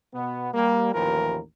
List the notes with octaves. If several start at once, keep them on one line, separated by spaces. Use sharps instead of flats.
B2 B3
G3 A#3
A1 D#2 E3 F3 A#4